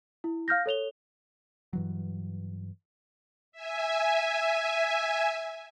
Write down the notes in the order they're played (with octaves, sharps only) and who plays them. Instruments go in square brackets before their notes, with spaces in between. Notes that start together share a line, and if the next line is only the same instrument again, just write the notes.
[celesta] E4
F5 F6 G6 A#6
A4 C#5 F7 G7
[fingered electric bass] G2 E3 F#3
[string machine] E5 G#5